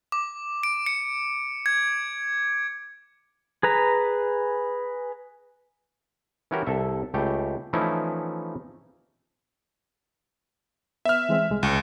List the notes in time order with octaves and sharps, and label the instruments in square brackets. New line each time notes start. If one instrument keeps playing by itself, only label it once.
[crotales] D6
D7
C#7
G#6
[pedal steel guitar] G#4 B4 A#5
[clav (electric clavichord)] E3 C#4 E4 F#4 G4 A#4
C2 A4 E5
C#2 A3 G4
E3 F3 A3 C#4 D#4 E4
[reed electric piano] B3 [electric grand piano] E5 F6
[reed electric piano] E3 G#3 C4
C2 G#3
[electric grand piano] C#2